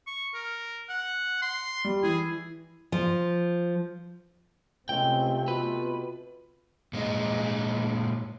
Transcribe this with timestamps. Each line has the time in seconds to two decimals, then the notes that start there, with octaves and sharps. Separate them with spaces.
0.07 C#6
0.34 A#4
0.89 F#5
1.42 C6
1.85 G3
2.03 E3 G#4
2.92 F3
4.89 C#2 C3 A3 C4 G5
5.48 B2 F4 B4
6.93 A#2 G#3 D#4